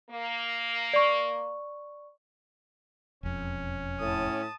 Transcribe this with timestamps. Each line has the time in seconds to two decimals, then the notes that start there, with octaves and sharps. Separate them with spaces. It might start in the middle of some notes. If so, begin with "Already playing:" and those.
0.10 A#3
0.93 D5 C#6
3.23 E1 F2 C#4
4.00 A2 A5 D#6